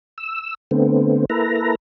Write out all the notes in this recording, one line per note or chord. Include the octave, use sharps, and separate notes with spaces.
E6
D3 A3 B3 C4
A#3 E4 A4 B4 A#5